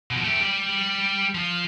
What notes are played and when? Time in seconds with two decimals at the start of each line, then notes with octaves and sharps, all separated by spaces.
0.11 B2 F3
0.24 A3 G4
0.41 G3 D5
1.35 F3 F4